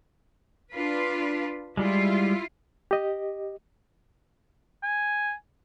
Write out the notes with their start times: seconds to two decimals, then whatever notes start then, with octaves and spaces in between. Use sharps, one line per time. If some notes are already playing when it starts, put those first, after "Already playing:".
0.71 D4 F4 B4
1.77 G3 G#3 E4 F4
2.91 G4 D#5
4.83 G#5